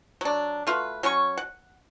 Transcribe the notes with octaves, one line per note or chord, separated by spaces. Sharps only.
F#3 D4
A3 F4 F#4 B4
F#3 C#4 C#5 C#6
F#5